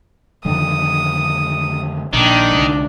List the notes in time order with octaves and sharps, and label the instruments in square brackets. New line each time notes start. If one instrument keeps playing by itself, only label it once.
[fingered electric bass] F2 D3 D#3 [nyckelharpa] D#6
[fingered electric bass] A#1 [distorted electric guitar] D#3 [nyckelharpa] D4
[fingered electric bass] C2 D3